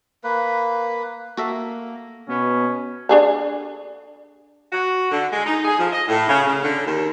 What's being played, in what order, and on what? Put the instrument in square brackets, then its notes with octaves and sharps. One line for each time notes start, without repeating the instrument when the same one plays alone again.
[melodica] A#3 B4
[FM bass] A#3 [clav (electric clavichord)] F#4 A4 E5
[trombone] B2 [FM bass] B3 [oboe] C#4
[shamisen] D4 G#4 A4
[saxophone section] F#4
D3
G#3
D#4
G#4
F3
D#5
A2
C#3
C#3
D3
D#2